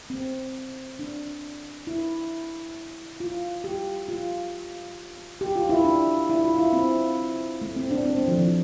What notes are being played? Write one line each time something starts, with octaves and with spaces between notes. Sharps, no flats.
C4
D4
E4
F4
G4
F4
G4
F4
E4
D4
E4
F4
E4
C4
A3
C4
D4
C4
A3
F3
E3